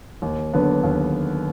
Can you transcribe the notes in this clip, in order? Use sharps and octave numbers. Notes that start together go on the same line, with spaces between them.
D#2
D3 F#3 B3 D4
D#2